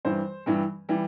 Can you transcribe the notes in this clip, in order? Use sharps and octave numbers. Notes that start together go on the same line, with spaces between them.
G2 E3 G3 C5
G2 E3 G3
E3 G3